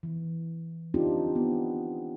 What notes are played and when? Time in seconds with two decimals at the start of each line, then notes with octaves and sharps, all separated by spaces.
0.03 E3
0.94 C4 D4 D#4 F4 G4
1.35 B3